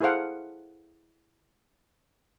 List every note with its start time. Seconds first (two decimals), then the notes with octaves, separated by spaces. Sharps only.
0.01 E4 G#4 A4 C5 F5 F#5